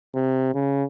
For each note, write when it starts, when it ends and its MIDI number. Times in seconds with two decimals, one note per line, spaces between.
0.15 0.54 48
0.54 0.83 49